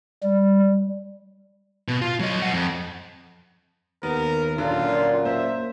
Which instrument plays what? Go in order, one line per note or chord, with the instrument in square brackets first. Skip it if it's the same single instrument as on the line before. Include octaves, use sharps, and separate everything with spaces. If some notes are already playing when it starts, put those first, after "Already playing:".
[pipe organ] G3
[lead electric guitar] B2
F4
F#3 D#5
D#5 F#5
F2
[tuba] D#2 [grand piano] B3 [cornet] A#4
[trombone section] F#2 A#2 [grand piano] D3 [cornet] F4
[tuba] A#3 [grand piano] C5 [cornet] E5